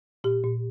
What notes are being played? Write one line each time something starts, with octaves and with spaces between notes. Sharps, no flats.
A#2 G4
A#2